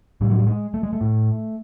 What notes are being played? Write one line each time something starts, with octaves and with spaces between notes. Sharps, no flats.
A2 G3
F#3
G3
G#3
A3
G#3
A3
A2